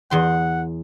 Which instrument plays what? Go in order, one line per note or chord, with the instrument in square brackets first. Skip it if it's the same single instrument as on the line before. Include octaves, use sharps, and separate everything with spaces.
[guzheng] E2 C6 [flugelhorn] F#5